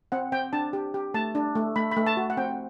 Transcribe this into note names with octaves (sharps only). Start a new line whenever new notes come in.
C4 F#5
C4 G5
D4 A5
G4
G4
A3 A5
D4
A3
A3 B5
B5
A3
A5
F#4
F#5
C4 G5